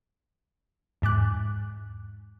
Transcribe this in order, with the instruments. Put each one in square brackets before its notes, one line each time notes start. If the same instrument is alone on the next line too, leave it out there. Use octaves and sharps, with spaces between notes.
[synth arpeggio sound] E2 G#2 D6 F#6